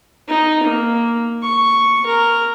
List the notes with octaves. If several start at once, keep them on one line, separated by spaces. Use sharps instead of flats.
D#4
A#3
C#6
A#4